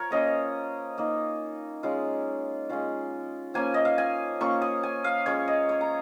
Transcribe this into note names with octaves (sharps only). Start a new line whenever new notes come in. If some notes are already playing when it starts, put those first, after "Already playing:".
Already playing: F3 A#4 C#5
A#3 C#4 F4 D#5
A#3 D#4
G#3 C#4 F4
G#3 C#4 F4
F3 A#3 C#4 G#5
D#5
F5
G#5
A#3 C#4 F4 C#6
D#6
G#5
F5
G#3 C#4 F4 C#5
D#5
C#5
A#5